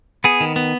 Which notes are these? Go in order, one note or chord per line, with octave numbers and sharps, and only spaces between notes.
B3 G#4
D#3
B3